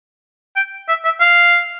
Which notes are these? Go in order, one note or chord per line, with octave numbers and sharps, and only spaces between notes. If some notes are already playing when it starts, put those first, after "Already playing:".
G5
E5
E5
F5